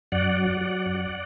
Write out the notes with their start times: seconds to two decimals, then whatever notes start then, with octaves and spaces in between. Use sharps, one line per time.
0.12 F#2 D5 F#5
0.37 F#3
0.61 F#3
0.86 F#2